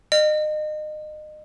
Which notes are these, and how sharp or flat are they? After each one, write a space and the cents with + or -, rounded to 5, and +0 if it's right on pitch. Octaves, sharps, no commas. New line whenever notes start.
D#5 -30